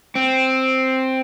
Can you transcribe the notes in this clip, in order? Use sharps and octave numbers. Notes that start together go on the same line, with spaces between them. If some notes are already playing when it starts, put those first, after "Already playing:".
C4